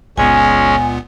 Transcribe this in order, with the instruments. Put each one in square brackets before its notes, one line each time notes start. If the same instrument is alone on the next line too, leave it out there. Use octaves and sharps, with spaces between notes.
[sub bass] F#1 [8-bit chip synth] C#2 A#2 B3 [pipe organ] G#3 C#4 [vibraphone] G#5